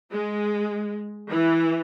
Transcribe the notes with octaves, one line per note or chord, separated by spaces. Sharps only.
G#3
E3